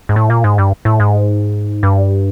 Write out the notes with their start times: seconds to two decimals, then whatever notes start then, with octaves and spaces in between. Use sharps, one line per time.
0.09 G#2
0.16 A2
0.30 A#2
0.44 G#2
0.58 G2
0.85 A2
1.00 G#2
1.83 G2